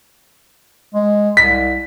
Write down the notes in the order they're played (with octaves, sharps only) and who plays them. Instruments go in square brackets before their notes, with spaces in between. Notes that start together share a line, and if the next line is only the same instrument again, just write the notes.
[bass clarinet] G#3
[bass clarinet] C2 [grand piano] B6